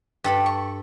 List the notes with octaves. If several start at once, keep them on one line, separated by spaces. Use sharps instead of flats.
G2 G4 A4 B5
C#6